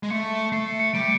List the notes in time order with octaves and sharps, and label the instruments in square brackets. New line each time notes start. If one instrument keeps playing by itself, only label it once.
[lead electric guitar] G#3
[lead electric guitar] A3 [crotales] C#7
[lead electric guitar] A3 [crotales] C7
[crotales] C7
C#7
[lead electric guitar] G3 [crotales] D7